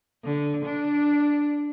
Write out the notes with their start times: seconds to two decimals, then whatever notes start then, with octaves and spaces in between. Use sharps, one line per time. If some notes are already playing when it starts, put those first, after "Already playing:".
0.24 D3
0.65 D4